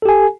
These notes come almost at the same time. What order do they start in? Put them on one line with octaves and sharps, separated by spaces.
A4 G4 G#5